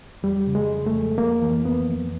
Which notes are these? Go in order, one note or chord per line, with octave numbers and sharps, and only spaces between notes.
F2 G3
C#3
G#3
F2
A3
F2
F2 A#3
E3
F2 B3
F2